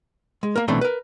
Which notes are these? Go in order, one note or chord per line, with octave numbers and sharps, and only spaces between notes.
G#3
A#3 A#4
B1 E3 A3 C4 D4 C6
A#4 B4